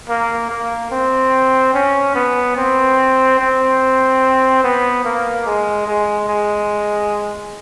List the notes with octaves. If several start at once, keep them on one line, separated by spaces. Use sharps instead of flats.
A#3
A#3
C4
C#4
B3
C4
C4
B3
A#3
G#3
G#3
G#3